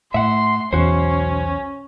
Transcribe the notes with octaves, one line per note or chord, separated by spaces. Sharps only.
A2 E5 F#5 C6
B1 E2 C#4 F#4 C5